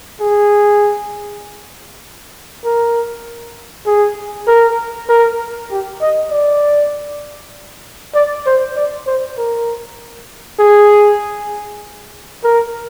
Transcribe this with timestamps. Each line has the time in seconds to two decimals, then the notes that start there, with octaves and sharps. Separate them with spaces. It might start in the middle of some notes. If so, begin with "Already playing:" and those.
0.20 G#4
2.64 A#4
3.86 G#4
4.47 A#4
5.09 A#4
5.71 G4
6.01 D#5
6.31 D5
8.15 D5
8.46 C5
8.76 D5
9.07 C5
9.38 A#4
10.59 G#4
12.44 A#4